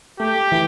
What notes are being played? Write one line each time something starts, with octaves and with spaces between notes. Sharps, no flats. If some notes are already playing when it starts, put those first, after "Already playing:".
A3 G4
E3